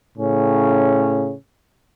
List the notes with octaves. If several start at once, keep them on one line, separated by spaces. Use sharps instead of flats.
A2 C#3 C#4